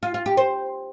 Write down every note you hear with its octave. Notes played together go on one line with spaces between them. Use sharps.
F4
F4
G4
C5